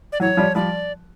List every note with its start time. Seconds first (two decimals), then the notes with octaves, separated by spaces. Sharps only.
0.12 D5
0.20 E3 F#3 C#5
0.37 F3 G3
0.55 F3 G3 D5